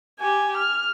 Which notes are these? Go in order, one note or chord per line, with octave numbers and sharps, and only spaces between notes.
G4 G#5
F6